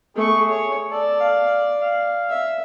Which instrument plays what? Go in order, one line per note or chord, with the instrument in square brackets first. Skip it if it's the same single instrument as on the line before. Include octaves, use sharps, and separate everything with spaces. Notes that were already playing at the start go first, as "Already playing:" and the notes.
[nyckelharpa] A3 C#6 [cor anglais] G#4
[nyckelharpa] C#5
[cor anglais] A4 [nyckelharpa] D5
[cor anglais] F5
F5
[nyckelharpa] E5